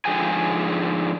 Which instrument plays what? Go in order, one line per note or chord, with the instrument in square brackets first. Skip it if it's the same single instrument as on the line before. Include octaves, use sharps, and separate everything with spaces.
[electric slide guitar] G#2 D3 F3 G#4 G5 G#5